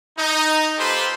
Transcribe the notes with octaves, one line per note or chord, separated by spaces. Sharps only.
D#4
A#3 F4 G4 A4 B4 C5